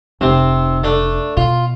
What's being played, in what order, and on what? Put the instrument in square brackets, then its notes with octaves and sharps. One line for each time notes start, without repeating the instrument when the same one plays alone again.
[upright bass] F1 [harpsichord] C3 C4
[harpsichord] A3 D4
[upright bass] B2 [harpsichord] F4